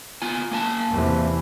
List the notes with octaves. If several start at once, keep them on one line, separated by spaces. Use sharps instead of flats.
B3 F4 G#5
A#3 G#5 A5
E2 C3 E3